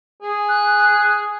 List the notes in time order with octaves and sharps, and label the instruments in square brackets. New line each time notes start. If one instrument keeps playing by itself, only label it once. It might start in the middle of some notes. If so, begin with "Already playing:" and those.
[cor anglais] G#4
[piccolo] F#6